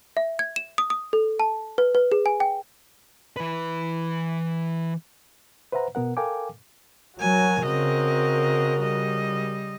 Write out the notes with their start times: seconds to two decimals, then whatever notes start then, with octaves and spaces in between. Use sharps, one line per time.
0.17 E5
0.39 G#6
0.56 E7
0.78 D#6
0.90 D#6
1.13 A4
1.40 A5
1.78 B4
1.95 B4
2.12 G#4
2.26 G#5
2.40 G5
3.37 E3 B4
5.72 B4 C5 E5 F#5 A#5
5.95 B2 B3 A#4 F#5
6.17 A4 A#4 F5 G5 G#5 D6
7.20 F#3 F#4 A#4 G#5
7.64 C#3 C4 D#5
8.80 G3 D#5